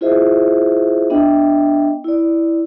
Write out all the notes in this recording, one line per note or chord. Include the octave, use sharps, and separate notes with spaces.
E4 F4 G#4 C5 D#5 E5
B3 D4 D#5 E5 G5
E4 D5